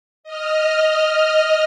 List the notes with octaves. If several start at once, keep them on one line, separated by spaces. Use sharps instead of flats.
D#5 F6